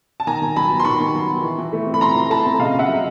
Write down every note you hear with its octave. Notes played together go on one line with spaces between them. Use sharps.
A5
D#3 G#5 A#5
D#3
F#3 A5 B5
B3
C6
D#3 B5 C#6
D#3
F#3
B3
E3
E3
A3
C4
B5
E3 A#5 C6
E3
A3 A5 B5
C4
C#3 D#5 F5
C#3 E5 F#5
F#3